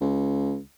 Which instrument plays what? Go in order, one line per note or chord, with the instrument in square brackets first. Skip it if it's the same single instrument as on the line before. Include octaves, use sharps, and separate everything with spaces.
[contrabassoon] C#2